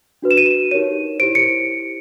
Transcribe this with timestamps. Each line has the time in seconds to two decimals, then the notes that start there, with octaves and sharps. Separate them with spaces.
0.22 D4 F#4 B4
0.31 E7
0.38 D#7
0.46 E7
0.71 D#4 G4 A#4 C#5 D#7
1.19 E4 G4 C5 D7
1.35 C#7